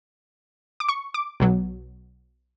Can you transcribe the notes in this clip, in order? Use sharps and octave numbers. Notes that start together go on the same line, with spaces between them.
D6
C#6
D6
B1 B2 F#3